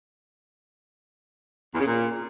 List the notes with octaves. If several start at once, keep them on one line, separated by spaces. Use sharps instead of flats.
E2
C#3
A#2